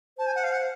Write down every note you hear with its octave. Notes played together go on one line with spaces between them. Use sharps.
C5 A5
G#5
F#5
F5
F#5